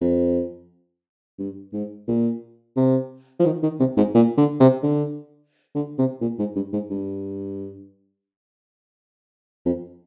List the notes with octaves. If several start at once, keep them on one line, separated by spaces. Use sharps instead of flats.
F2
G2
G#2
A#2
C3
F3
D#3
D#3
C3
G#2
A#2
D3
C3
D3
D3
C3
A#2
G#2
G2
G#2
G2
F2